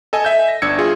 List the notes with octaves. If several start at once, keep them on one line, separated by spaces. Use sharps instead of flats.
A4 D#5 G#5
E5 G6
A#6
G1 D4 E6 G#6 C#7
F4 G#4